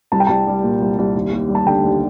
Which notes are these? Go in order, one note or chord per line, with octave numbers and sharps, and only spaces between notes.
C2 A5
G5
C2 A5
G3
A#2
C2
C2
D#2
D#2
G3
A5
D3 G5
D#2